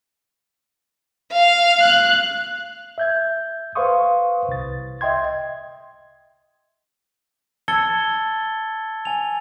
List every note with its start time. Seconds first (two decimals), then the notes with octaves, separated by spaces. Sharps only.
1.32 F5
1.80 F#6
2.98 E5 G6 G#6
3.75 B4 C5 F5 C6 C#6 D#6
4.48 C2 A6
5.01 D#5 E5 G5 C6 G#6
7.68 A5 E6 G#6 A6 C#7 G7
9.05 G#5 F7